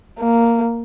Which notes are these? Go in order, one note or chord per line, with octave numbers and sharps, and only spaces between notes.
A#3